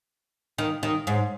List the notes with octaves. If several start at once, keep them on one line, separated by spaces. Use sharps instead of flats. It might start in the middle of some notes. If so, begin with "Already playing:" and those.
D#3
D#3
G#2